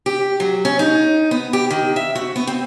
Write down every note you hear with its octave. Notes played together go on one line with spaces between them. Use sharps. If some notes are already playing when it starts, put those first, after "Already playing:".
G4
F#3
C#4
D#4
B3
G4
D#3
E5
F#4
B3
C4